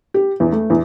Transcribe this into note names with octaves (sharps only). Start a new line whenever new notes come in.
G4
E2
A3
E2